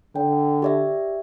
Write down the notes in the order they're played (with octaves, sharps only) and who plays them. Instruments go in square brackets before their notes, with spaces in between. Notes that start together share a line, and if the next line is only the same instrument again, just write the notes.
[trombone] D3 [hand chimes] G5
[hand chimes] G4 D5 E5